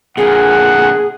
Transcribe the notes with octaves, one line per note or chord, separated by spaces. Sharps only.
A#2 D3 G#4 F#5